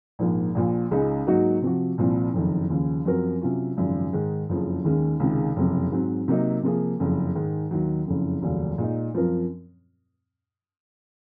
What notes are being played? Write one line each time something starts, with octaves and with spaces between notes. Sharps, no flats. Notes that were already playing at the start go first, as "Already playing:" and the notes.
A#1 G#2 F3 A#3
A#1 A#2 F3
C#2 C#3 G#3 D#4
G#2 F#3 A#3 D#4 F#4
C3 F3 C4 F#4
C2 A#2 F3 C4
F#1 F2 D#3
D#2 C#3 F3
F#2 F3 C4 F#4 A#4
C3 F#3 C#4 F4
G#1 F#2 C#3 F3
G#2 D#3 G#3
F#1 F2 C#3 F3
D#2 D#3 G#3 C#4
C#2 C3 D#3 G#3
F#1 F2 C3
G#2 F#3 C4
C3 F#3 A#3 D#4
C3 F3 A#3 F4 G#4
F#1 F2 C#3
G#2 D#3 G#3
D#2 D#3 F#3
F#1 F2 C#3
F1 D#2 C#3 F#3 C#4
A#2 G#3 D#4
F#2 F3 C4 F4 A#4